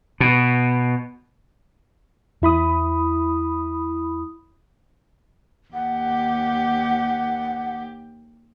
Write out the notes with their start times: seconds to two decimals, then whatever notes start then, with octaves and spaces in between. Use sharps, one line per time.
0.20 B2
2.42 E2 E4 B5 D#6
5.74 D#2 G4 F#5